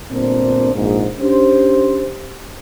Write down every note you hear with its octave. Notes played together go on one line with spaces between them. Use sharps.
G1 A#2 C4 D4 A#4 C5
A#1 G#2
C#4 D4 G4 C5